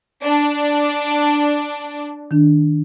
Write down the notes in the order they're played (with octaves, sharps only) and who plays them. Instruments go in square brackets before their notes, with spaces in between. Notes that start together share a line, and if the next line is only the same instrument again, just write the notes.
[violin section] D4
[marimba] D#3 D4